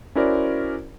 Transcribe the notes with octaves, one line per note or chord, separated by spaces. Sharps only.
C#4 E4 F#4 A#4 C5 D5